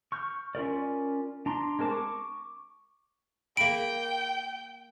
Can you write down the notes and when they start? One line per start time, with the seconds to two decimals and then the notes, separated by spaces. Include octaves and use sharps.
0.12 C#6 F6 G6
0.55 C#4 F4 A#4 D5
1.46 D4 A#5 C6
1.79 G#3 C4 A#4 A5 D6
1.92 C#6 D6
3.57 A#3 G5 B5 D7